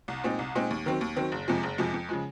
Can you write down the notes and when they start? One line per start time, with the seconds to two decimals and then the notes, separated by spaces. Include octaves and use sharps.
0.08 C2
0.24 A#2 G#3 C4 D#4
0.39 C2
0.55 A#2 G#3 C4 D#4
0.71 D#2
0.86 D#3 F#3 C4
1.01 D#2
1.16 D#3 F#3 C4
1.32 F#1
1.48 F2 C3 F3 G#3
1.63 F#1
1.78 F2 C3 F3 G#3
1.94 F2
2.09 C#3 F3 G#3